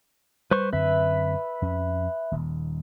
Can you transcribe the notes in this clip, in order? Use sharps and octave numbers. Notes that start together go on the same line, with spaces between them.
G3 B4 C5 C#6
F#2 D3 C4 B4 E5
F2 C#4
D#1 D#2